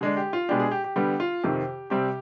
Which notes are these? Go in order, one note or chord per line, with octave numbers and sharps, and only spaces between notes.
D3 G#3 D4 G#4
G4
F4
B2 G#3 D4 G4
G#4
G4
G4
D3 G3 B3 G4
F4
F2 C3 D#3 G4
C3 G3 C4 G4